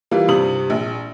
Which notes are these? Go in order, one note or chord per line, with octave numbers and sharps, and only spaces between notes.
E3 G3 A#3 F4
G2 C3 D#6 F#7
A#1